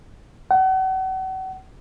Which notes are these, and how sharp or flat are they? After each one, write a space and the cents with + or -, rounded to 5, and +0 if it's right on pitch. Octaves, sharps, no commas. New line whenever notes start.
F#5 +40